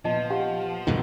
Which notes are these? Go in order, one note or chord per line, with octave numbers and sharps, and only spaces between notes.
A#2 F3 B3 F4 D#5 A5
G4 F5 F#5
G2 B2 D#3 E3 F4 A4